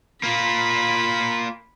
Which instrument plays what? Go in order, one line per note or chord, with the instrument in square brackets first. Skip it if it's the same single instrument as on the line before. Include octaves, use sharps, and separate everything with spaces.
[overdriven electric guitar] A#3 F4 [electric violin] B5